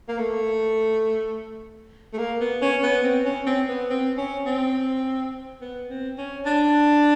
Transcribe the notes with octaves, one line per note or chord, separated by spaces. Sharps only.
A#3
A3
A3
A#3
B3
C#4
B3
C4
C#4
C4
B3
C4
C#4
C4
B3
C4
C#4
D4